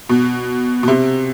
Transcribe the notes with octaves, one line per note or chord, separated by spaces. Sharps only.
B2
B2
C3